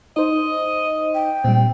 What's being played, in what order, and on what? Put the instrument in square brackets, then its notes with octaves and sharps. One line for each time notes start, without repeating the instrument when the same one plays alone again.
[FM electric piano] D#4 C5 [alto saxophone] D#5
[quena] G5
[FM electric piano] A#2 G3 [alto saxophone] C4